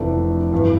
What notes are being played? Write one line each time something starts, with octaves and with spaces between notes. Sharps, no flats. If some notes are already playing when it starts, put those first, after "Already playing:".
Already playing: F1 F2 E3 A3 D4
G2 E3